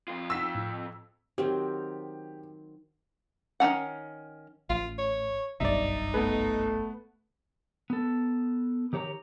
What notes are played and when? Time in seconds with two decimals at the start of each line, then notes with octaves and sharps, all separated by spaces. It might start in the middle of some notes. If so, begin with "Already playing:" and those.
0.08 F2 F4
0.30 D#4 F#5 E6 A#6 B6
0.55 A2
1.38 D#3 F#3 C4 G4
3.60 D#3 F3 C#4 F#5
4.70 A1 F4
4.99 C#5
5.60 F#1 B1 G2 D#4 D5 E5
6.14 A3 B3 B4
7.90 B3 A4
8.93 D#3 G4 C#5 F#5 A#5